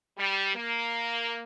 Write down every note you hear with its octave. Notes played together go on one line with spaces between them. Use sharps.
G3
A#3